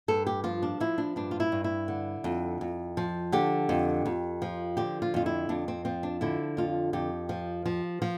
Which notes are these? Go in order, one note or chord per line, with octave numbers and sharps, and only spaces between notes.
G2 A4
G4
F3 F4
D4
F3 E4
D4
G2 D4
F4
E4
G2
E4
D3
F2
F2
F3
D3 G4
F2
F2
F3
D3 G4
F4
F2 F4
E4
F2 D4
C4
F3 C4
D4
D3 E4
F2 F4
F2 G4
F3
F3
F3